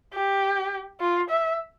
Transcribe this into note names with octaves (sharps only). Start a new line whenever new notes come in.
G4
F4
E5